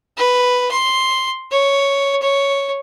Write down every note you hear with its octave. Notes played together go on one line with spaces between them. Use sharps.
B4
C6
C#5
C#5